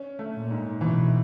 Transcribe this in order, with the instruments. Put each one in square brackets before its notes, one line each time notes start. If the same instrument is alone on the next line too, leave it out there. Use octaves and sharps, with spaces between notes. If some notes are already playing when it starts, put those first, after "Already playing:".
Already playing: [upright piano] C#4
A3
[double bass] A#2
[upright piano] G#2
[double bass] B2 [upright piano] E3